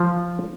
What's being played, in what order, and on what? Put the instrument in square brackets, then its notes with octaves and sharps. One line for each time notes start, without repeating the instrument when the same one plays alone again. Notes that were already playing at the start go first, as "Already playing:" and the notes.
Already playing: [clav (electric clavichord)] F3